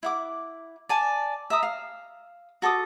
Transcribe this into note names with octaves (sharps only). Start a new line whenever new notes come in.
E4 F#5 D6
D5 G#5 A5
E5 A#5 D#6
F5
F#4 A4 D6 D#6